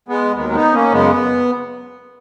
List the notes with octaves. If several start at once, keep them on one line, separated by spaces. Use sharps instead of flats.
G#3 B3
D#2 D#3 F#3 G#3 B3
B3 D#4
A#3 C#4
F#2 C#3 G#3 B3